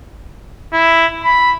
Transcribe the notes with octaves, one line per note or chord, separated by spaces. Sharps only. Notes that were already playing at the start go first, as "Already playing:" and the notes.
E4
B5